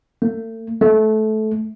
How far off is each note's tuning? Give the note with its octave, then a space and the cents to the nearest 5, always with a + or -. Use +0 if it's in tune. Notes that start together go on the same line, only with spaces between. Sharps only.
A3 +40
A3 -20